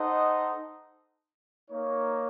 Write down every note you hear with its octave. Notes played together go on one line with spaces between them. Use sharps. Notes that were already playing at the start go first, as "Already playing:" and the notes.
Already playing: D#4 A4 C5 D#5 F#5
A#3 D#4 A#4 C#5